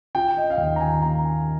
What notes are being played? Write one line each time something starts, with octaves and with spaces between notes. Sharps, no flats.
F4 G5
D#5
F5
D#2 G5
A#5
G#5
A#3 A#5